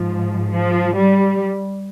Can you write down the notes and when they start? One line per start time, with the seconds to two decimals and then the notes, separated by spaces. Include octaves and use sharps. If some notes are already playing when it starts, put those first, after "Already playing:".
Already playing: G#2 F3
0.53 F3
0.95 G3